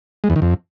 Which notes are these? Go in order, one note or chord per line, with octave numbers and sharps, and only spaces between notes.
G#3
E2
D#3
F2